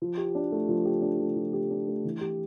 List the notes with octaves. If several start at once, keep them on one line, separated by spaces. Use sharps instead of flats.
F3
G4
D4
A3
F3
G4
D4
A3
F3
G4
D4
A3
E3
G4